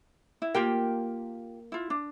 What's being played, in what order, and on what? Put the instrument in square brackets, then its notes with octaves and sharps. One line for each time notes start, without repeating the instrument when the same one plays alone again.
[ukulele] E4
[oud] A#3 [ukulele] F4 G4 G5
[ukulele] E4 F4
D4